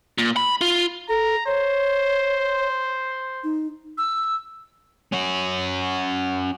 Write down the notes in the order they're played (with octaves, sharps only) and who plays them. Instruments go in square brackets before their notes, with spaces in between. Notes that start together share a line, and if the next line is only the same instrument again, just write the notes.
[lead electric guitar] A#2
B5
F4
[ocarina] A4 [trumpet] A#5
[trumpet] C5 [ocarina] C#5
[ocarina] D#4
[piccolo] E6
[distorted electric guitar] C#4 F#4